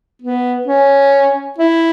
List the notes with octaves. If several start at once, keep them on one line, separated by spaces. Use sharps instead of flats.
B3
C#4
E4